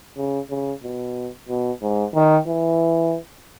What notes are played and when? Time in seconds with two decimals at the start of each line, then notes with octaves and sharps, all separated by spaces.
0.17 C#3
0.50 C#3
0.83 B2
1.49 B2
1.82 G#2
2.15 D#3
2.47 E3